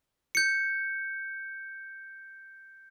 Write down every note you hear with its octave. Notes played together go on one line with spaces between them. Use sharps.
G6 C#7